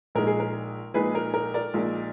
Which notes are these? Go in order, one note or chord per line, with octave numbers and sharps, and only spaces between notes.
A#1 A#2 G#3 D#4 A#4
G#4
A#4
A#1 A#2 G#3 D#4 G#4 B4
A#4
A#4
A#4 D5
A#1 A#2 G#3 D#4